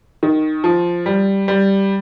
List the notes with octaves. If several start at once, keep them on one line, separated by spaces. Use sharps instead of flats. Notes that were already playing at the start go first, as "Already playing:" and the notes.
D#3
F3
G3
G3